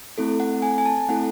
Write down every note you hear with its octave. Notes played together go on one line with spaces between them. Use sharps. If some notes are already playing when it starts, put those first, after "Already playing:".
A3 C4 E4 A4
F#5
G#5
G#5
A5
A3 C4 E4 A4 F#5